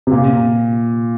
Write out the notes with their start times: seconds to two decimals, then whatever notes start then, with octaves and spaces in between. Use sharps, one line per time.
0.07 C3
0.11 A#2